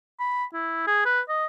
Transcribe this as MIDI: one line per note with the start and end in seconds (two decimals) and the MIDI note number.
0.19 0.44 83
0.53 0.84 64
0.87 1.03 68
1.05 1.21 71
1.29 1.46 75